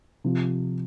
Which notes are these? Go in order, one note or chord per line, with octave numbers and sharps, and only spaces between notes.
C3 F3